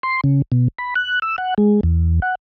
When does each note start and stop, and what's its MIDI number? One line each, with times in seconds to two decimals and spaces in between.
0.03 0.21 84
0.24 0.42 49
0.52 0.68 47
0.78 0.94 83
0.95 1.19 90
1.22 1.36 88
1.38 1.54 78
1.58 1.81 56
1.83 2.20 40
2.22 2.35 78